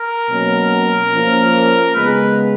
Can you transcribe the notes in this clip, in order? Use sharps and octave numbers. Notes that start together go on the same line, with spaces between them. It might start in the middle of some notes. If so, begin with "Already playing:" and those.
Already playing: A#4
B2 F#3 A#3 C#4
F3 A#3 C#4 F4
C#3 G#3 B3 B4